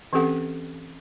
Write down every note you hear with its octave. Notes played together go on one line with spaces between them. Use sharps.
E3 C4 C#4 G4 A4 F#5